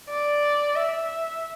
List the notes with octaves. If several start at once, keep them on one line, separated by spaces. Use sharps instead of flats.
D5
E5